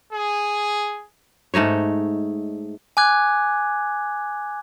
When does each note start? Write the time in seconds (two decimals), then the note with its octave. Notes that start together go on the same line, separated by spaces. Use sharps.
0.13 G#4
1.54 G#2 A3 D#4 C#5
2.97 G#5 D6 F#6 G#6